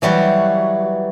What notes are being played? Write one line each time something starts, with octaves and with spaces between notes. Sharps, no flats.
E3 F#3 G3 F#4